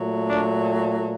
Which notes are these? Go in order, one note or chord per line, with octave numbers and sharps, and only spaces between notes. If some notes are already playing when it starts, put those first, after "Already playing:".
Already playing: A#2 F#3 A3
D4